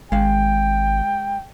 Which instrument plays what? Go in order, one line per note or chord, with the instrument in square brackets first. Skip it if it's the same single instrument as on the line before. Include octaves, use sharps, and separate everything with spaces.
[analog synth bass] G#1 [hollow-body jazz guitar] G#3 F5 [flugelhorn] G5